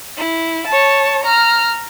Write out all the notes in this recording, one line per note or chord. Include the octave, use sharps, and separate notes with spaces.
E4
C#5 A5
A#5 F6